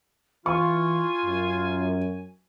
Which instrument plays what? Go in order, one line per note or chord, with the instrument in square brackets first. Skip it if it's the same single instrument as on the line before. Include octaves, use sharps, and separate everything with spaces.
[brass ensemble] E3 [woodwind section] F4 [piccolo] G#5 [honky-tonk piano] C#6
[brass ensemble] F#2